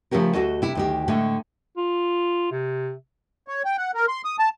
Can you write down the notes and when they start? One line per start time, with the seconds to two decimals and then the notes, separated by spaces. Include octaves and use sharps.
0.11 C#3 F3 A3 C#4 G4 A#4
0.34 D2 F#4 A4 D#5
0.62 C3 E4
0.75 D2 D#3 G4
1.08 A2 D3 G#3 A3
1.77 F4
2.52 C3
3.48 C#5
3.65 G5
3.78 F#5
3.95 A#4
4.08 C6
4.25 D#6
4.39 A5